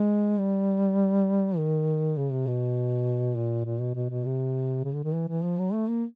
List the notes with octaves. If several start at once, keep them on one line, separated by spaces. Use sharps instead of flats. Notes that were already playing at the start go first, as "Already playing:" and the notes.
Already playing: G#3
G3
D#3
C#3
C3
B2
A#2
A#2
B2
B2
B2
C3
C#3
D3
D#3
E3
E3
F3
F#3
A3
A#3